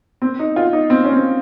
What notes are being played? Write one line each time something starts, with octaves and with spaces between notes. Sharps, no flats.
C4
D#4
F4
D#4
C4
C#4
C4